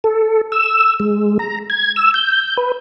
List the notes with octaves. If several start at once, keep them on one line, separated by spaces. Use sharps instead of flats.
A4
E6
G#3
A#5
G#6
E6
G6
B4